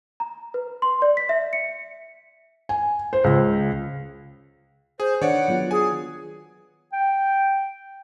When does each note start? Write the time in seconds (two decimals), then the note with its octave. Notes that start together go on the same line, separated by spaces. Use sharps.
0.20 A#5
0.54 B4
0.82 C6
1.02 D5
1.17 B6
1.29 E5
1.53 C#7
2.69 G#5
3.13 C5
3.24 C#2
5.00 G#4 C5
5.22 D#3 D4 B4 C#5 D5 F#5
5.48 F#3 B3 F4
5.71 G#4 G#5
6.93 G5